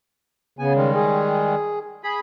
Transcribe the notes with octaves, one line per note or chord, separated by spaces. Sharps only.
C#3 B3 G#5
D#3 G3 G#3
G#4
G#4 B5